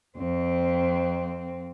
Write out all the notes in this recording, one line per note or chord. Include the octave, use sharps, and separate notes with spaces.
F2 C4